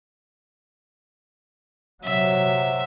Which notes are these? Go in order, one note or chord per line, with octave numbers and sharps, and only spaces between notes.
C3 F#3 E5